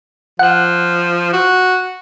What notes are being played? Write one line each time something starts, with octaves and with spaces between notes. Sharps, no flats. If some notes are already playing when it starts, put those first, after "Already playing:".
F3 F#5 F#6
F#4